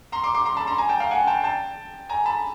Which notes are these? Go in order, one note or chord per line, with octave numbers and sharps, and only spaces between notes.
A#5 C6
C6 D6
C6 D6
A#5 C6
A5 B5
A#5 C6
G#5 A#5
G5 A5
F5 G5
F#5 G#5
G5 A5
G5 A5
G#5 A#5
A5 B5